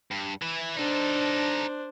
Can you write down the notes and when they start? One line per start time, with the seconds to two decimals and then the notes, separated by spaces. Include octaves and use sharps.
0.11 G2
0.42 E3 E4
0.77 D4 D#4 A4 C5